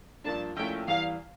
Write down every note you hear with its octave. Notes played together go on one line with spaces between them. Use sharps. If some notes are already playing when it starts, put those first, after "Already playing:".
G2 F3 A#3 D4 A5
A#1 A#2 A3 C#4 E4 G5
E2 E3 G3 F5